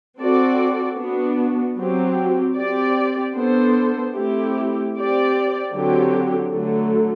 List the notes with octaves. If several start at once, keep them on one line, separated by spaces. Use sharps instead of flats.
C4 F#4 A4 D5
B3 D4 F#4
F#3 C4 G4
C4 G4 D5
B3 D4 A4 C5
A3 C4 E4 G4
C4 G4 D5
D3 F#3 C4 G4
D3 F#3 A3